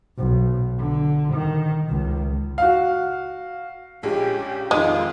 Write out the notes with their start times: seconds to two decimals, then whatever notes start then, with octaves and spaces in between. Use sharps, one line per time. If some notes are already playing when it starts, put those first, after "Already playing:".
0.18 B1
0.79 D3
1.33 D#3
1.90 C#2
2.58 F#4 F5
4.03 A#1 C#3 G#3 G4
4.71 F2 D#3 G#3 F4